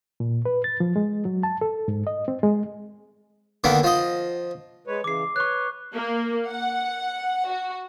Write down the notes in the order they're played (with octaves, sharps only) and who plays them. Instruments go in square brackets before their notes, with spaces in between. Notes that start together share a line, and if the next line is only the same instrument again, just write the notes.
[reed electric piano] A#2
B4
A6
F3
G#3
F#3
A5
A4
G#2
D#5
C4
G#3
[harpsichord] D3 D#3 A#3 B3
F3 D#5
[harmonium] G#3 B4 C#5
[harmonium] C#3 E3 [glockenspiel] D6 C7
[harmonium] B4 C#5 [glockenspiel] C#6 F#6
[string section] A#3
F#5
F#4